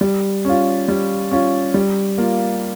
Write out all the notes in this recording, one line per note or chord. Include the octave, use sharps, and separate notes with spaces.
G3
C#4 F4
G3
C#4 F4
G3
A#3 F4